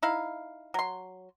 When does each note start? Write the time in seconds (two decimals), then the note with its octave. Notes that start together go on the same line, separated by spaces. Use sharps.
0.03 D#4 E4 F5
0.74 F#3 C6